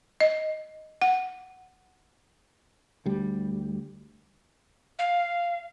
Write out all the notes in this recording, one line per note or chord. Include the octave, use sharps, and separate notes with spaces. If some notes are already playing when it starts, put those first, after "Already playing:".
D#5
F#5
D2 G3
F5